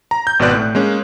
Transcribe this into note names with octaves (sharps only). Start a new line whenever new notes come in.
A#5
G6
G#1 B2 B4 D5 F#6
A2
G#3 A#3 C#4